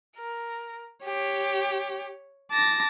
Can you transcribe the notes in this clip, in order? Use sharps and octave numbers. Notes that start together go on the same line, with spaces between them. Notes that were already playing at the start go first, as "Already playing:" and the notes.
A#4
G4 C#5
A5 D6 A#6